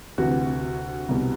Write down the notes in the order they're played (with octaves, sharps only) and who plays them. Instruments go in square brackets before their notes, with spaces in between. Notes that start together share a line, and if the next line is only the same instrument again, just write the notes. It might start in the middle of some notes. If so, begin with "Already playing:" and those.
[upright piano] D2 C3 E3 F#4
C2 B2